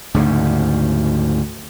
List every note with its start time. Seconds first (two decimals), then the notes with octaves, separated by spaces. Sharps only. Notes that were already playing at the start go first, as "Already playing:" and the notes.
0.14 D2 G#2 C#3